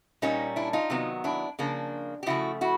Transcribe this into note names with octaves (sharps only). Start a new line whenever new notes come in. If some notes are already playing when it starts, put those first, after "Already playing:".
A#2 G3 A#3 C#4 D#4
D4 E4
D#4 F4
C3 D#3 F#3 B3
D4 E4
C#3 F3 A#3 D4
G4
C#3 F3 A3 E4 F#4
E4 F#4